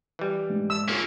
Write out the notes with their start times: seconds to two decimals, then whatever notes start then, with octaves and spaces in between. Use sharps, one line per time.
0.19 E3 G3
0.50 G#2
0.70 E6
0.88 A#3 C#4 F4 G#4